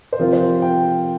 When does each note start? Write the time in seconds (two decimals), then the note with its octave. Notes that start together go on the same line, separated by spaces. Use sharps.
0.13 C5
0.19 C3 F3 C4 F4 A#4
0.33 C5
0.62 G5